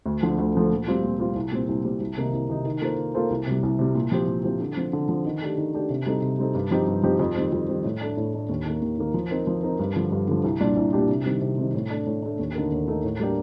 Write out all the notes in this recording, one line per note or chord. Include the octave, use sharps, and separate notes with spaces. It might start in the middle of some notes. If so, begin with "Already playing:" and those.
D2
D3 F3 A3
D2
D3 F3 A3
A#2
G3 C4 F4
A#2
G3 C4 F4
C2
A#2 G3 C4
C2
A#2 G3 C4
C2
C3 D#3 A#3 D#4
C2
C3 D#3 A#3 D#4
D#3
A#3 F4 A4 C5
D#3
A#3 F4 A4 C5
C2
C3 G3
C2
C3 G3
A#2
F3 C4 G4 C5
A#2
F3 C4 G4 C5
D3
F3 C4
D3
F3 C4
D#3
A3 D4 G4
D#3
A3 D4 G4
C3
G3 C4 D#4 A4
C3
G3 C4 D#4 A4
G2
F3 C4 D#4 G4
G2
F3 C4 D#4 G4
F2
D#3 G3 C4
F2
D#3 G3 C4
A2
A3 D4
A2
A3 D4
D#2
D#3 A#3
D#2
D#3 A#3
F3
C4 D#4 A#4
F3
C4 D#4 A#4
G2
D3 F3
G2
D3 F3
C2
A#2 G3 D4 G4
C2
A#2 G3 D4 G4
C3
D#3 G3 C4
C3
D#3 G3 C4
A2
A3 D4
A2
A3 D4
D#2
D3 A3 D#4 A#4
D#2
D3 A3 D#4 A#4
A2
G3 A#3 D4 G4